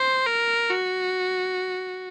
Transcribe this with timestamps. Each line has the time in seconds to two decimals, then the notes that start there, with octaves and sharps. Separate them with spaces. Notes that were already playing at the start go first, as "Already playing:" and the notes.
Already playing: C5
0.26 A#4
0.70 F#4